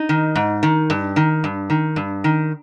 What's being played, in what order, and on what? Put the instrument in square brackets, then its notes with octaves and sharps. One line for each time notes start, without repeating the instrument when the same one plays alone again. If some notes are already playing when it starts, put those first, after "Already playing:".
Already playing: [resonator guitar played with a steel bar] D#4
D#3
G#2
D#3
G2
D#3
G2
D#3
G2
D#3